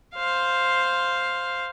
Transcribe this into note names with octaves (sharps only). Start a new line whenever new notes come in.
C5 F5